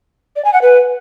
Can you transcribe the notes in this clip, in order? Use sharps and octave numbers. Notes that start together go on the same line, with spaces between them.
D5
G#5
F#5
B4